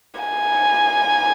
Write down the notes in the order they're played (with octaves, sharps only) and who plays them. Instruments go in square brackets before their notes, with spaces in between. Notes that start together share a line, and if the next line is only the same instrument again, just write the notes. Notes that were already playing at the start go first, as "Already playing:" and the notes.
[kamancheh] G#5